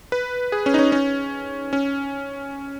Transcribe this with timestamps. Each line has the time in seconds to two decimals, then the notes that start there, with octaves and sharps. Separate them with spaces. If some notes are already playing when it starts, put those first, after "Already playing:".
0.12 B4
0.52 G#4
0.66 C#4
0.74 D#4
0.79 C#4
0.92 C#4
1.73 C#4